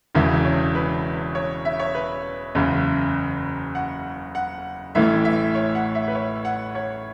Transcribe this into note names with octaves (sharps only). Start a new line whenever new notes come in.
E1 E2 C#3 E3 E5
C#5
B4
C#5
E5
C#5
B4
F#1 E2 C#3
F#5
F#5
A1 A2 E3 E5
E5
C#5
F#5
E5
B4
C#5
F#5
C#5